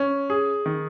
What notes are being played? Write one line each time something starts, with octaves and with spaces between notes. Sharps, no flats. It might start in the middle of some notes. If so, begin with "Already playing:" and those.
Already playing: C#4
G#4
D#3